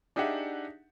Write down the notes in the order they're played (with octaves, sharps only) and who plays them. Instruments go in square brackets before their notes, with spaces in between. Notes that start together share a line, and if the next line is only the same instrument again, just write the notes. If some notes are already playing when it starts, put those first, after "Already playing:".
[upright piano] D4 D#4 G4 G#4 E5 F#5